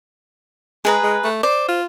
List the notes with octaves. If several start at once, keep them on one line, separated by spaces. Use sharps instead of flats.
G#3 G#4 B4 A#5
G#3
A3
C5 D5
F4